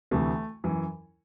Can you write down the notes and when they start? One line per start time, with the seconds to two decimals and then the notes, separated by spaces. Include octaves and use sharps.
0.11 D2 C3 E3 A3
0.64 F#2 E3